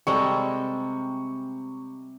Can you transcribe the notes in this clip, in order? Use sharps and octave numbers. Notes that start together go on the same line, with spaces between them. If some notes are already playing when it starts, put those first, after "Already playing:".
C3 G3 G#3 A4 C#6